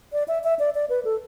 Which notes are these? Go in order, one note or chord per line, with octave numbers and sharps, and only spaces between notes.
D5
E5
E5
D5
D5
B4
A4